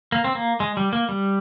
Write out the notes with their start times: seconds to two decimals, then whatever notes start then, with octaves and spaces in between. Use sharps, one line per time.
0.12 A#3
0.24 C4
0.35 A#3
0.60 G#3
0.77 G3
0.93 A#3
1.09 G3